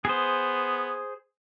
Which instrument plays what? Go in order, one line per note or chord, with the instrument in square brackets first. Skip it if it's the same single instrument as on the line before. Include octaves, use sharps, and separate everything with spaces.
[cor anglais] B3 [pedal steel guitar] G#4 C5